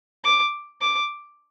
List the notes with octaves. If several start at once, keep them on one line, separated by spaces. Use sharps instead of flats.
D6
D6